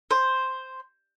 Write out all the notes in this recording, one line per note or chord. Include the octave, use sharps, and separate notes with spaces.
C5